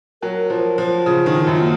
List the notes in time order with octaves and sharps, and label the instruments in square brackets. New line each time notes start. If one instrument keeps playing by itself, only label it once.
[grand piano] F#3 [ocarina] A#4
[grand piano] F3
F3
[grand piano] C#3 [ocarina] F4
[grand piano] D#3
[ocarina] F4
D#4
[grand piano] F#2 [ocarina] F4
[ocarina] A#3